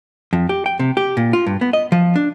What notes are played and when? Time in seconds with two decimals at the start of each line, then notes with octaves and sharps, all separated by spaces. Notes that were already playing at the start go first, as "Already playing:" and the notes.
0.33 F2
0.49 G4
0.66 G5
0.79 C3
0.97 G4
1.17 A#2
1.33 F4
1.47 G2
1.61 B3
1.73 D#5
1.92 F3
2.16 D4